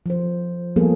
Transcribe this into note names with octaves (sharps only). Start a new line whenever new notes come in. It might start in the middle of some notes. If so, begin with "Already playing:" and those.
F3 C5
F3 G3 A#3 B3 G#4 A4